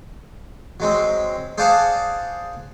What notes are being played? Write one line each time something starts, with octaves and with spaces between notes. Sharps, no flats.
F#3 G#3 C4
G#4 C5 D5 F5 F#5 A5